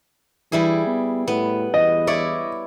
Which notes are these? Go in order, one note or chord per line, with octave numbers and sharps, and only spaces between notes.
E3 G3 E4 G#4
B3
A2 B3
E2 D#5
E4 C#5 D5